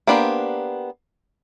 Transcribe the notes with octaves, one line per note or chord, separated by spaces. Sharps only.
A#3 B3 D4 G4 C5